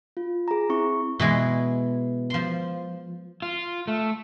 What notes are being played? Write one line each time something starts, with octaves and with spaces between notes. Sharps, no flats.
F4
G#4 A#5
C4 E4 C#6
B2 E3 G#3
F3 C6
F4
A3